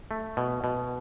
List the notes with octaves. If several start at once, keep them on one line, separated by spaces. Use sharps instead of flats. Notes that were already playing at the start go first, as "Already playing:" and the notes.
A3
B2
B2